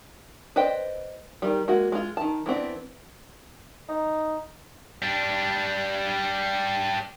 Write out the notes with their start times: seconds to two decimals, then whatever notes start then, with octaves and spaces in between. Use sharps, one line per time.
0.56 B4 C5 D5 D#5 G5
1.42 D#3 G3
1.68 G#3 A#3 F#4
1.92 G#3 F4
2.17 D#3 A5
2.46 E3 B3 C4 D4
3.89 D#4
5.02 G3 D4